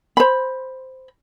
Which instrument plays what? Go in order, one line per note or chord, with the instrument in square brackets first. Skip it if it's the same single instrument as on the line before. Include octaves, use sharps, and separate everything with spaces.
[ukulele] C5 B5